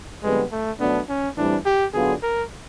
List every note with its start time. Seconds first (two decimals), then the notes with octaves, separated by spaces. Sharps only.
0.23 F2 D3 G3 G#3 B3
0.52 A3
0.80 B2 F#3 A3 B3 D4
1.09 C#4
1.37 A2 E3 G3 C4 D4
1.65 G4
1.93 D3 F#3 B3 D4 F4 G#4
2.23 A#4